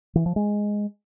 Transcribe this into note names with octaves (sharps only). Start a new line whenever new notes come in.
E3
F3
G#3